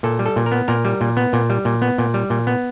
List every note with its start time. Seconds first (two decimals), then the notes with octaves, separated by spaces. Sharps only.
0.03 A#2 A4
0.19 G3
0.26 A4
0.36 A#2
0.46 A#4
0.52 B3
0.68 A#2 A#4
0.85 G3
1.01 A#2
1.17 B3
1.33 A#2
1.50 G3
1.65 A#2
1.82 B3
1.98 A#2
2.14 G3
2.30 A#2
2.47 B3